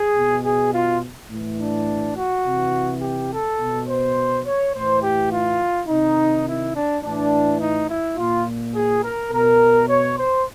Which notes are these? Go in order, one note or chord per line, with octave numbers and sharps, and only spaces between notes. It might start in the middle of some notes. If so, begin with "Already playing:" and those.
Already playing: G#4
B2
G#4
F4
A2 E3
D4
F#4
C3 E3
G4
A4
B2
C5
C#5
A2 E3 C5
G4
F4
C3 D#3 D#4
E4
D4
A2 E3 D4
D#4
E4
A#2 F4
G#4
A#4
B2 A#4
C#5
C5